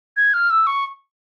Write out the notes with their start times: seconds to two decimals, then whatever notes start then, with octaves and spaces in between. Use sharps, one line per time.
0.17 G#6
0.34 F6
0.50 E6
0.67 C#6